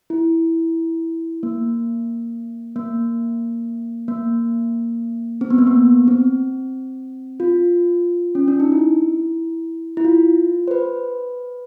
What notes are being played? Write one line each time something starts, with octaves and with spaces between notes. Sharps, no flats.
E4
A#3
A#3
A#3
C4
B3
A#3
B3
C4
F4
C#4
D4
D#4
E4
E4
F4
C5
B4